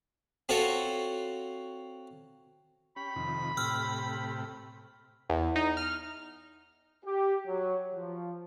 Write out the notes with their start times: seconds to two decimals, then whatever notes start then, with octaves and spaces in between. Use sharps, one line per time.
0.49 C4 F4 F#4 A4 C#5
2.96 C#4 G4 B5
3.16 F2 C3 D#3
3.57 A2 C3 G4 E6 F6
5.30 E2
5.56 D#4
5.77 F6
7.05 G4
7.47 F#3
7.94 F3